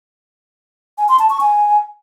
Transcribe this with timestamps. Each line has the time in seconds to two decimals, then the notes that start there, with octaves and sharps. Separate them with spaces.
0.98 G#5
1.09 C6
1.19 A5
1.30 C#6
1.40 G#5